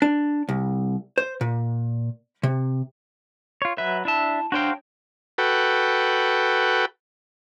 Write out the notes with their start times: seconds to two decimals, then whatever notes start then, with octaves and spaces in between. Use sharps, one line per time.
0.02 D4
0.49 C2
1.18 C5
1.41 A#2
2.43 C3
3.62 F4 C#5
3.78 F#3 B4 E5
4.05 D4 E4 E5 A5
4.52 D4 F#4 C5 C#5 F5 G5
5.38 F#4 A4 B4 G5